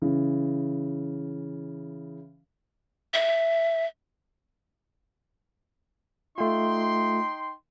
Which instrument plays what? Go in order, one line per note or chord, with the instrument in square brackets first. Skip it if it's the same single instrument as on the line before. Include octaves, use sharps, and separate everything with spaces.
[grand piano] C#3 E3
[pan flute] E5
[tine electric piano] A3 F4 [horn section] D#4 G5 C6